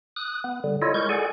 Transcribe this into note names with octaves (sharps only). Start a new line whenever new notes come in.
D#6 F#6
B3
D3 G3
E4 F4 A4 C#5 D#5
G#3 A#4 C#6 G6
G#4 A4 D5 F#5 G#5